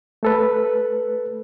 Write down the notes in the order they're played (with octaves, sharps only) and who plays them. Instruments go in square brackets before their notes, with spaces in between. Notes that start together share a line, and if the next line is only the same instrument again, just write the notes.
[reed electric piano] A3 A4 B4